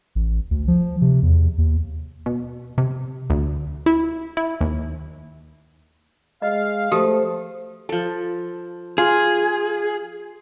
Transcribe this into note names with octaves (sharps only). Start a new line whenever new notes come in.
A1
D2
F3
C3
E2
D#2
B2
C3
D2
E4
E4
D#2
G#3 D#5 F5
F3 A3 G4 D#6
F3 A4
F4 G#4